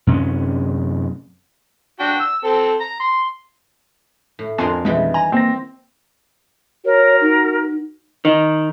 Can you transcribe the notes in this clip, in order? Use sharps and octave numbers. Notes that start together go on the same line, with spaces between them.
F#2 C3 C4 C#4
D4 F#4 G5
E6
C4 A4
A#5
C6
A2
F2 D4 F#4 A#4 G#5 C6
B2 D#3 E3 G3 G#3
G#5 A#5
A#3 C4 A#6
F#4 A#4 C#5
D#4
D#3